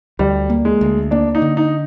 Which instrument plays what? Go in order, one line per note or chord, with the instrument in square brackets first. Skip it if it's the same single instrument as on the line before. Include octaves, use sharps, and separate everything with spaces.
[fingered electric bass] D2 [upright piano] G3
[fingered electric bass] A#3
[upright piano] G#3
[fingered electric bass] D2
[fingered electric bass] A#3 [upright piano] D4
[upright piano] D#4
[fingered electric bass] D3
[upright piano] D#4